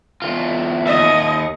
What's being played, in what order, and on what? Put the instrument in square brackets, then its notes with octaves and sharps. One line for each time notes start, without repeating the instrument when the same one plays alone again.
[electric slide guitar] E2 D#3 F4
[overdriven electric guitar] D#2 E5 [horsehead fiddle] D#5